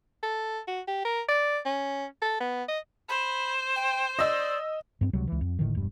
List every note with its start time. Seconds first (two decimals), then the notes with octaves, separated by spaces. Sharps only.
0.23 A4
0.68 F#4
0.88 G4
1.05 A#4
1.29 D5
1.66 C#4
2.22 A4
2.41 B3
2.68 D#5
3.09 C5 B5
3.76 G5
4.19 D5 D#5 E6
5.01 G2 A#3 C4
5.13 C#2 C3 F#3 G3
5.28 C#2 E3
5.41 F2
5.59 F1 A2 D3 D#3
5.75 E1 G2